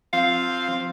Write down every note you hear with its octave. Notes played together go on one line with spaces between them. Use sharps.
F3 C4 F5